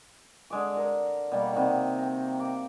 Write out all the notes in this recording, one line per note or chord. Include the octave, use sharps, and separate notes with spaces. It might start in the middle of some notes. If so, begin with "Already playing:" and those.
D3 G#3 D6
A#4
B2 G3 A#3
C3 D#3 F#5
G5 A#5
A#3 D6